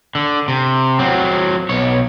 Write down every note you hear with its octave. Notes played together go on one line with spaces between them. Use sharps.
D3
C3
F#3 C4
B1 C#5